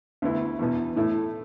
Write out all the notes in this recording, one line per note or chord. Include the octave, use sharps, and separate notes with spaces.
D2 D3 B3 E4
E2 B2 B3
A2 A3 E4